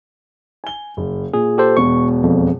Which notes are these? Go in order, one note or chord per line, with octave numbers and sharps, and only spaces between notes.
G#5 G7
F#1
A#2 G#4
G4 A4 C5
E1 B2 C#6
F2